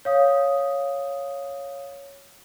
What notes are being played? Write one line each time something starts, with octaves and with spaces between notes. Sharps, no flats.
C#5 F5 D#6